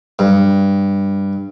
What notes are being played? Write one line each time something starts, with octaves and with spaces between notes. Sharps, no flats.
G2